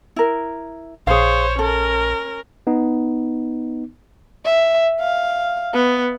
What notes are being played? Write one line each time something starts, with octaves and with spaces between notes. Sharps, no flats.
E4 A#4
A#1 G#4 C5 C#5 F5
C#4 A4 A#4
B3 D#4
E5
F5
B3